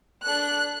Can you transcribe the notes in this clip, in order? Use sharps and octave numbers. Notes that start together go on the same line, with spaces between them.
D4 A4 F#6